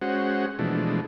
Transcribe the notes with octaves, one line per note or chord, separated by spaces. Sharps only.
G#3 C#4 F#4 C5 F#5
B2 E3 F3 G#3 A3 D4